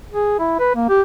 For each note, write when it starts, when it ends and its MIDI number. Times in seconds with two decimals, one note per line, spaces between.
0.12 0.39 68
0.39 0.59 64
0.59 0.73 71
0.75 0.85 58
0.89 1.02 67